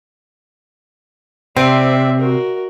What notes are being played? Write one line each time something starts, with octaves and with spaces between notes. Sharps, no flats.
C3 C4 D5 E5
F#4 A#4